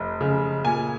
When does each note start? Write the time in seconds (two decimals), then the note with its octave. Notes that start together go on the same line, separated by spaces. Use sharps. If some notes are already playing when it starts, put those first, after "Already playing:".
Already playing: F1
0.21 C#3
0.64 A#2 G#5